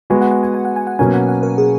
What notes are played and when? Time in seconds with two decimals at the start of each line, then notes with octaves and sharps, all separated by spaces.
0.10 G#3 B3 F#4 G#5
0.22 F#5
0.32 F#5
0.43 G#5
0.54 G#5
0.65 F#5
0.76 G#5
0.87 F#5
0.99 B2 F#3 A#3 C#4 G#5
1.14 F#5
1.29 F#5
1.43 A#4
1.58 G#4